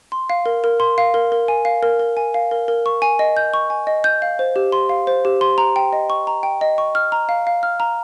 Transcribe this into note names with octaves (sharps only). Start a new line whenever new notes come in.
C6
F5
A#4
A#4
C6
F5
A#4
A#4
G#5
F5
A#4
A#4
G#5
F5
A#4
A#4
C#6
G#5
D#5
G6
C#6
G#5
D#5
G6
F5
C5
G4
C6
F5
C5
G4
C6
A#5
G5
D#5
C#6
A#5
G5
D#5
C#6
F6
A#5
F5
F5
F6
A#5